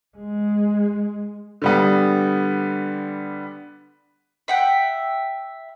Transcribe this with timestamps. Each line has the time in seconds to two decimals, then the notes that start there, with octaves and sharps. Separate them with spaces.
0.17 G#3
1.62 D3 G3 B3
4.48 E5 F#5 G5